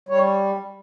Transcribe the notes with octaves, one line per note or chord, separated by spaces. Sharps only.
G3 C#5